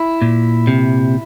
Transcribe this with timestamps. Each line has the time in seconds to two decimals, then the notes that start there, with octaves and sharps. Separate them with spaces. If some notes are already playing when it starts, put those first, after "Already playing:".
Already playing: E4
0.22 A#2
0.67 C3